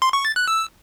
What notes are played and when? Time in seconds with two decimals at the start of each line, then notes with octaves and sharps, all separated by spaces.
0.02 C6
0.13 C#6
0.25 A6
0.36 F#6
0.48 E6